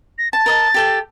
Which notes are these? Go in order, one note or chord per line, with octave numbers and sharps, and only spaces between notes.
A#6
A5 A6
A#4 D#5 A5
G4 A4 G5